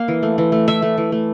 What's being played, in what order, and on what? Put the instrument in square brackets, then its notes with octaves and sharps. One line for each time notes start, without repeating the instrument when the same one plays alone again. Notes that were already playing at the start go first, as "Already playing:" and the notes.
Already playing: [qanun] A#3 F5
E3
A3
E3
A3
E3 E5
A3
E3
A3